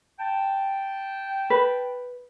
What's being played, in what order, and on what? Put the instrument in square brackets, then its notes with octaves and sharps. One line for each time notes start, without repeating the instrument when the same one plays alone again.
[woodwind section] G5 A5
[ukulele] B4